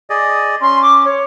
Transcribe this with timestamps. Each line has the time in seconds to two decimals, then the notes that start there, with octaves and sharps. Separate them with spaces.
0.10 G#4 D5 D#5
0.61 C#4 C6
0.82 D6
1.05 C#5